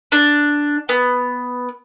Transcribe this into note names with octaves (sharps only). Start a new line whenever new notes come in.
D4
B3